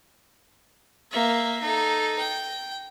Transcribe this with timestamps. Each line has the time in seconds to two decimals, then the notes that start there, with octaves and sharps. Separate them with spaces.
1.11 A#3 E5
1.62 D#4 A4
2.19 G5